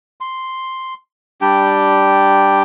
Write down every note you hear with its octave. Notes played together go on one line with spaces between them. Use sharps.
C6
G3 D4 G4 G5